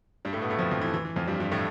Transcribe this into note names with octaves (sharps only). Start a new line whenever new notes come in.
G2 G3
A2 A3
B2 B3
A2 A3
F2 F3
F2 F3
E3
E3
E3
F2 F3
G2 G3
G2 G3
A2 A3